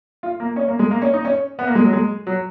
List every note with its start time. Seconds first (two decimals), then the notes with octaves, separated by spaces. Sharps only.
0.23 F4
0.40 A#3
0.56 C#4
0.68 A#3
0.79 G#3
0.91 A#3
1.02 C#4
1.13 D#4
1.25 C#4
1.59 B3
1.67 A#3
1.75 G#3
1.85 F#3
1.93 G#3
2.27 F#3